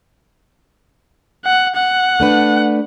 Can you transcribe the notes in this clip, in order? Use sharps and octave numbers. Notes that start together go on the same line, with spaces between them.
F#5
F#5
A3 D4 B4